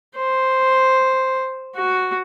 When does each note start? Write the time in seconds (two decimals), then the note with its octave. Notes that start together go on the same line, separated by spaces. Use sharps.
0.16 C5
1.76 F#4